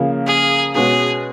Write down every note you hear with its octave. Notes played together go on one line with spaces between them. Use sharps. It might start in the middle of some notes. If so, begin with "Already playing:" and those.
Already playing: C#3 F3 A#3
G#4
B2 G#3 C#4 F#4 G#4